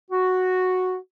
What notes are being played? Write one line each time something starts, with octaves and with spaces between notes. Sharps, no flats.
F#4